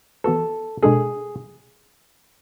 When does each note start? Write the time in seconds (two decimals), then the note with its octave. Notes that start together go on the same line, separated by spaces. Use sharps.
0.24 E3 B3 F#4 A4 B4
0.83 B2 G#3 D4 G#4 A4